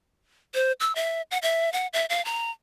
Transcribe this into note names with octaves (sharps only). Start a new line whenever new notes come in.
C5
E6
E5
F#5
E5
F#5
E5
F5
A#5